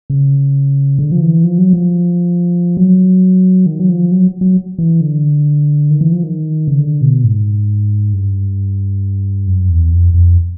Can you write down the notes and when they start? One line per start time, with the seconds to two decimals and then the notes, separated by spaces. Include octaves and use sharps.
0.10 C#3
0.99 D3
1.12 F3
1.21 E3
1.44 F3
1.58 F#3
1.73 F3
2.77 F#3
3.66 D#3
3.80 F#3
3.89 F3
4.12 F#3
4.41 F#3
4.78 E3
5.01 D3
5.90 D#3
6.01 E3
6.12 F3
6.23 D#3
6.68 C#3
6.79 D3
7.01 B2
7.24 G#2
8.13 G2
9.47 F#2
9.69 E2
9.92 F2
10.14 F2